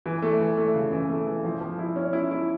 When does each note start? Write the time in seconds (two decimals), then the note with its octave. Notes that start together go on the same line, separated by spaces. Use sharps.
0.06 E3
0.22 A3
0.40 E3
0.57 A3
0.75 C#3
0.92 E3
1.09 A3
1.27 E3
1.44 F3
1.61 F3
1.79 E4
1.96 C#4
2.13 E4
2.31 E4